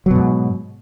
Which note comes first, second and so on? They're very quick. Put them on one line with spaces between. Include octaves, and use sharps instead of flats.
F#3 B2 G#2